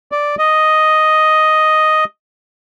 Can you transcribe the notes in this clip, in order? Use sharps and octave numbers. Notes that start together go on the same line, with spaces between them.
D5
D#5